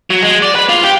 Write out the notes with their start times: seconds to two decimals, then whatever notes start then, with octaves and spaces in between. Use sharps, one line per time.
0.10 F#3
0.23 G#3
0.42 D5
0.55 B4
0.69 F4
0.84 G4